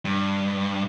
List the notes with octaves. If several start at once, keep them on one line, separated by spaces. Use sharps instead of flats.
G2